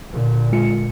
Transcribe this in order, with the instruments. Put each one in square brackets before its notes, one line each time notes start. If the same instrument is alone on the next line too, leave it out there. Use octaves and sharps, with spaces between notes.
[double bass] A#2 D3
[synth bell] G#3 F4 C#7